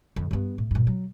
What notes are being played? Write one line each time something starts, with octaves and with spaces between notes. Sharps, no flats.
F2 D3
G2 B3
A2
G2 A#2
F#3